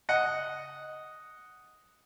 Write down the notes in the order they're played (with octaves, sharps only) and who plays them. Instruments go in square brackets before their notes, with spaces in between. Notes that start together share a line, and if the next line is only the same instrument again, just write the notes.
[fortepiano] D#5 F#5